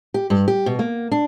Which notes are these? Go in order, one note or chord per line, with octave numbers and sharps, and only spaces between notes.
G4
G2
G4
B2
A#3
D4